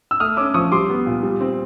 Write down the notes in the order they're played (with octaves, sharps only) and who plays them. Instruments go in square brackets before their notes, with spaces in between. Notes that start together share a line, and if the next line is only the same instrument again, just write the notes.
[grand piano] E6
A3 D#6 F6
C#4 D6 E6
F3 C#6 D#6
G3 C6 D6
B3
A#2
G3
C4